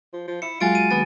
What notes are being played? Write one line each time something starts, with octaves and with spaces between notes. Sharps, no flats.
F3
F3
E4 C#7
F#3 G#3 F4 F#4 G#5 A6 D7
D#7
D#2 B3 A6